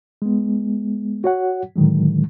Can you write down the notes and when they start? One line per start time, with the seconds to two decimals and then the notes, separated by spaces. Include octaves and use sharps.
0.22 G#3 B3
1.24 F#4 C#5 F#5
1.76 A2 D3 D#3 F#3 G#3